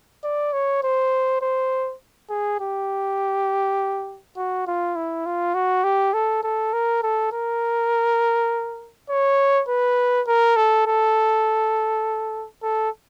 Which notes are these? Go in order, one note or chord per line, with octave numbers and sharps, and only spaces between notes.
D5
C#5
C5
C5
G#4
G4
F#4
F4
E4
F4
F#4
G4
A4
A4
A#4
A4
A#4
C#5
B4
A#4
A4
A4
A4